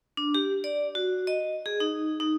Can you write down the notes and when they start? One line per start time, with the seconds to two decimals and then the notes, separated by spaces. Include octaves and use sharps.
0.17 D4
0.35 G4
0.64 D5
0.95 F#4
1.27 D#5
1.66 G#4
1.80 D#4
2.20 D#4